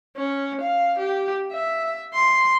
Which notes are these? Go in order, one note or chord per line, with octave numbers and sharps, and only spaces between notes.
C#4
F5
G4
E5
C6